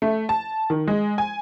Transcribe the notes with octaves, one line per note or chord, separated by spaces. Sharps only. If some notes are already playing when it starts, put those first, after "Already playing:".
A3
A5
D#3
G#3
G#5